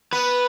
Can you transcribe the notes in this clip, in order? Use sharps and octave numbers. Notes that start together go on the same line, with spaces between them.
B3 B4